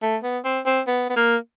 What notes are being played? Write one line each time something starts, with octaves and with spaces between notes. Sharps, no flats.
A3
B3
C4
C4
B3
B3
A#3